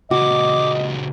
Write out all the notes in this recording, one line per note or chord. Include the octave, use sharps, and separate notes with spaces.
C#2 A#2 F#4 D#5 D6